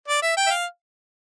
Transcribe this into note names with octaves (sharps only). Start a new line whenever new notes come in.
D5
E5
G5
E5
F5